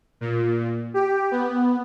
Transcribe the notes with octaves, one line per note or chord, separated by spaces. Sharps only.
A#2
G4
B3